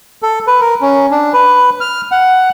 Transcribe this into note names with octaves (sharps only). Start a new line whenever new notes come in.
A4
B4
A#4
C#4
D4
B4
F6
F#5